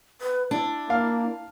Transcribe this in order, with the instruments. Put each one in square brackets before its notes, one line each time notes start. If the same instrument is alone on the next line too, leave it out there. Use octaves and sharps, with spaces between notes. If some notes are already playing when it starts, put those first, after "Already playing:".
[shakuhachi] B4
[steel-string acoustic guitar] D4 [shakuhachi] E4
[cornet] A#3 [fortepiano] F5